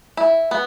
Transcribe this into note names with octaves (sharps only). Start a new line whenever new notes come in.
E4
B3